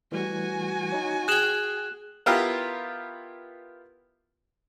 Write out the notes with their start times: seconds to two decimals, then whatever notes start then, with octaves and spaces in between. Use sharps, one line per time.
0.12 E3 G3 A3 F#4 G#5
0.92 D#4 C#5
1.28 G#4 G5 F#6 G#6 E7 F#7
2.26 B3 E4 F4 G4 A#4